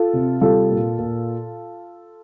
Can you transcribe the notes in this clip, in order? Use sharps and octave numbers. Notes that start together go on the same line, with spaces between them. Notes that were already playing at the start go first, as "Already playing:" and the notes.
Already playing: F4 A4
C3
G3 F4 A4
A#2
A#2